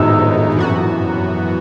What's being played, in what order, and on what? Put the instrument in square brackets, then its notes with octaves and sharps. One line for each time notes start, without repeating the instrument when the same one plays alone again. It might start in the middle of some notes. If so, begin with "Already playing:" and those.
Already playing: [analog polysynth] D#3 G#3 B3 D#4 [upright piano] E6
[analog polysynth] F#2 E3 B3 F#4